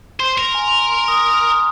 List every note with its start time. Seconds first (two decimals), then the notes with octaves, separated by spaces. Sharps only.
0.20 C5 C6
0.38 A#4
0.54 G#5
0.68 C6
0.73 A#5
0.90 C6
1.08 D#6
1.26 D#6
1.34 F6
1.42 D#6